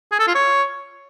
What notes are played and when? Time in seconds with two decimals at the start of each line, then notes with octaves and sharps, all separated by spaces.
0.12 G#4
0.20 A4
0.27 F4
0.35 C#5